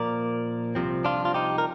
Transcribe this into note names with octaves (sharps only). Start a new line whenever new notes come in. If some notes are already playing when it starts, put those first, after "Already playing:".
Already playing: A#2 F3 A#3 A#4 D5
C2 C3 F3 C4
D4 F4
F4
D#4 G4
A#4